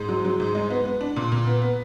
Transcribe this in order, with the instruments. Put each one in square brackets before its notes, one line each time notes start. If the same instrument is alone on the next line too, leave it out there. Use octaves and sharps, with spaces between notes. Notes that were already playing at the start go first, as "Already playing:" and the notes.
Already playing: [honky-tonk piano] G#2
F#3
F#3
G#2
G#3
B3
B3
D4
A#2
A#2
B3
B3